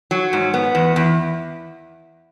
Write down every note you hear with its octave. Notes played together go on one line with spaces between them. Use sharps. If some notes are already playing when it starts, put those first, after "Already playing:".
F#3
G#2
B3
E2
E2